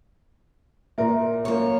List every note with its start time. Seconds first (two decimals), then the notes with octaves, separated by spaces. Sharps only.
0.98 A#2 A#4 E5
1.45 F#2 A#3 C#5